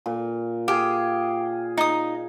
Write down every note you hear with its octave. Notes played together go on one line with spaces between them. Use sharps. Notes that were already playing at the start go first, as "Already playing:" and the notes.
A#2
G4 G#4 F5
D#4 D#6